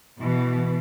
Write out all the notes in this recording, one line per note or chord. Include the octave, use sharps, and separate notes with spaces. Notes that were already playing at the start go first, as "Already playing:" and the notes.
B2 E3